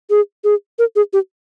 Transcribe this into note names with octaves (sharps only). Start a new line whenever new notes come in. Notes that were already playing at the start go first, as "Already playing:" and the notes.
G#4
G#4
A#4
G#4
G4